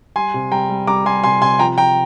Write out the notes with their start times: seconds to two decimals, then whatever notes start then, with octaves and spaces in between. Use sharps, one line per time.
0.16 G3 G#5 C6
0.34 C3
0.52 G3 G5 A#5
0.70 G3
0.87 G3 A#5 D6
1.05 G3 G#5 C6
1.24 C3 G#5 C6
1.41 C3 G#5 C6
1.59 F3 G5 A#5
1.77 F3 G5 A#5